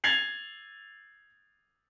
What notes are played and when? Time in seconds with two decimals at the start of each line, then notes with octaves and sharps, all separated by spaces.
0.04 G#6 A6 C7 F7 F#7